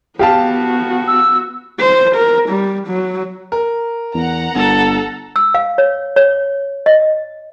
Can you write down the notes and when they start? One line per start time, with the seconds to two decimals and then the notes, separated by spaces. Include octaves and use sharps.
0.19 B3 F#4 G4 F5 A5
1.08 E6
1.80 C5
2.15 A#4
2.49 G3
2.87 F#3
3.52 A#4
4.15 E2 F#5 A#5
4.55 G1 A4
5.36 E6
5.54 F5
5.78 C#5
6.16 C#5
6.86 D#5